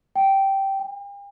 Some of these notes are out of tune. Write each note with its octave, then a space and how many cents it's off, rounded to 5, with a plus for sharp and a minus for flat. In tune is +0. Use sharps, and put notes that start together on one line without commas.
G5 -10
G5 +40